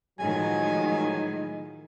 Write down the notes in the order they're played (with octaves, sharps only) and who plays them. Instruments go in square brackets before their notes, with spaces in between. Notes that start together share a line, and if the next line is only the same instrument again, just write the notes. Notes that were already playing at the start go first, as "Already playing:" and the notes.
[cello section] A2 D#3 F3 [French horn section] F#3 G#3 [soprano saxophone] G#5